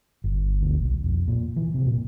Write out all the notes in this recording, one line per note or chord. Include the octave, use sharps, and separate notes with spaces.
G1
D2
B1
F2
A#2
E3
C3
A#2